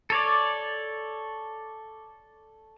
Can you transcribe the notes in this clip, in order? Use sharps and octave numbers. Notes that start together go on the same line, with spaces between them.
A4 C#5 D5